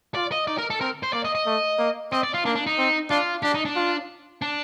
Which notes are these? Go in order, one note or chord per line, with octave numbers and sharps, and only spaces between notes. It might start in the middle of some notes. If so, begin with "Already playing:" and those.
F4 D5
D#5
D#4 D5
A#4
A4
C4 A#4
C5
A#3 D5
D#5
D#5
A3
A#3
C4 D#5
D5
F4
A#3 D4
D4
D#4
C4
D4 F4
D4 G4
D#4
D4
F4
D4